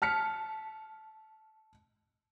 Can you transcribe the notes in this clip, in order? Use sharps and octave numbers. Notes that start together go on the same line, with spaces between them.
A5 F6 B6 C#7